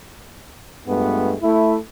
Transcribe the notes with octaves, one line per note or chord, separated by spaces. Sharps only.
G2 G#3 A3 B3 F4
A3 E4